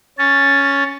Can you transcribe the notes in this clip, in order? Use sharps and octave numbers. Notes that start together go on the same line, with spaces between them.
C#4 A6